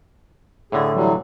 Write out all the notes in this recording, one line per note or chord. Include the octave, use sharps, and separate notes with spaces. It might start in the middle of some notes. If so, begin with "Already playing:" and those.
A2 D3 G#4
E3 F#3 G3